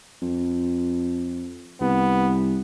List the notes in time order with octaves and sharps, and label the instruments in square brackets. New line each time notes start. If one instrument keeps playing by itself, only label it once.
[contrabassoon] F2
[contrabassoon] C2 [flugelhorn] B3